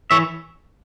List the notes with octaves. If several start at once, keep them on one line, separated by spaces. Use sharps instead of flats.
E3 C#5 E5